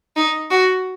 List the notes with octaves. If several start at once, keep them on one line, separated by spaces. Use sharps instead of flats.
D#4
F#4